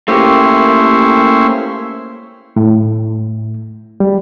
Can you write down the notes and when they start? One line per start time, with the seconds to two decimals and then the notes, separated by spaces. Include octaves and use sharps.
0.08 A3 A#3 C#4 E4 G4 C5
2.56 A2
4.00 G3